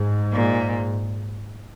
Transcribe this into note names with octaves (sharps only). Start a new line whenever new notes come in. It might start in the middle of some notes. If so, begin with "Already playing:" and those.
Already playing: G#2
A#2